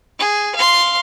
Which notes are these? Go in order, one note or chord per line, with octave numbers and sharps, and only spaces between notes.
G#4
F5 C6